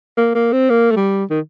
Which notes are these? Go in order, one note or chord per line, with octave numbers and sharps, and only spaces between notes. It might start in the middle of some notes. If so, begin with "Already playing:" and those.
A#3
A#3
C4
A#3
A3
G3
D#3